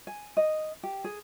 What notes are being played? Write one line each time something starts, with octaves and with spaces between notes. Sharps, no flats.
G#5
D#5
G4
G#4